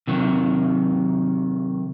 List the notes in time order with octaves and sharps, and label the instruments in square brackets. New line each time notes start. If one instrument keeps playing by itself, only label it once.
[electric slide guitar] C3 D#3 F#3